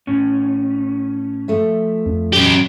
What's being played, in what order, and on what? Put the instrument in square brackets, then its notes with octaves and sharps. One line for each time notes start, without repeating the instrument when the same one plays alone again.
[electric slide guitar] A2 C#4
[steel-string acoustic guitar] F3 A3 E5
[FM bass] F2
[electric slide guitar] F#3 [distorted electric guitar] C#4 G4